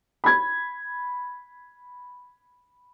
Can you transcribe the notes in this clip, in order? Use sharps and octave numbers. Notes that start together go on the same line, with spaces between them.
B5 G#6